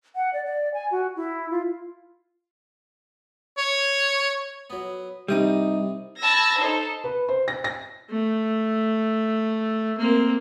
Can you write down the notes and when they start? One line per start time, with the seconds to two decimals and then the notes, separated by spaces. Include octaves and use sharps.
0.15 F#5
0.33 D5
0.46 D5
0.74 G#5
0.91 F#4
1.16 E4
1.51 F4
3.58 C#5
4.70 F#3 B3
5.28 C2 C3 G3 D#4 D#6
6.19 A5 B5 E6 G#6 A#6
6.58 D#4 A4 C5
7.04 B4
7.28 C5
7.48 A#6
7.64 A#6
8.10 A3
9.98 A#3 C4